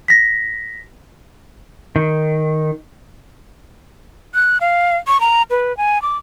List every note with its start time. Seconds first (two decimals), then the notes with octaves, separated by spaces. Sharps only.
0.08 A#6 B6
1.96 D#3
4.35 F#6
4.61 F5
5.07 C#6
5.21 A#5
5.51 B4
5.77 G#5
6.02 D6